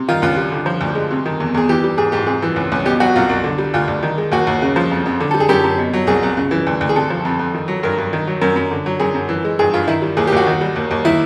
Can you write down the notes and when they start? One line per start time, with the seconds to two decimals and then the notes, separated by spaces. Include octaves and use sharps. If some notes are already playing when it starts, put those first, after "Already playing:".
Already playing: C3
0.09 D#3 F4
0.22 C#2 F4
0.37 G3
0.52 D3
0.66 F3
0.81 D2
0.95 G#3
1.11 C3
1.26 D#3
1.40 E2
1.54 E2 G#4
1.69 E3 G4
1.84 G3
1.97 G#2 G#4
2.12 G#2 G4
2.27 C3 G#4
2.42 E3
2.56 C#2
2.72 C#2
2.85 B2 G4
3.00 F#3 F#4
3.16 C2 F4
3.29 C2
3.44 D3
3.58 G3
3.74 D2 F4
3.88 D2
4.03 D#3
4.18 G#3
4.32 D#2 F#4
4.47 D#2
4.62 C#3
4.76 F3
4.91 F2
5.06 F2
5.20 D3
5.31 G3 A4
5.40 G#4
5.49 F#2 G4
5.64 F#2
5.78 B2
5.93 F#3
6.07 C2 G#4
6.23 C2
6.37 C#3
6.51 E3
6.67 D2
6.81 D2
6.89 G#4
6.95 C3 A4
7.10 F3
7.25 F2
7.39 F2
7.54 D#3
7.68 F#3
7.83 G2 A#4
7.98 G2
8.13 D#3
8.27 F#3
8.41 F#2 A#4
8.56 F#2
8.71 D3
8.86 F#3
9.00 F#2 G#4
9.15 F#2
9.29 E3
9.45 G#3
9.59 G2 G#4
9.73 G2 F4
9.87 D#3 E4
10.02 G3
10.17 D#2 G#4
10.27 G4
10.32 D#2 F#4
10.46 D#3
10.61 G3
10.76 D#2
10.91 D#2
11.05 D#3 E4